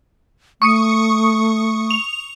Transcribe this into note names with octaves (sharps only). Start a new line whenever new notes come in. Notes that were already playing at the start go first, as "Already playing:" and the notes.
A3 C#6 D#6 C#7
F7